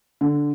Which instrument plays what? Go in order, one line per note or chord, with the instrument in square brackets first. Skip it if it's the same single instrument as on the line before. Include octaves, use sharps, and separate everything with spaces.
[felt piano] D3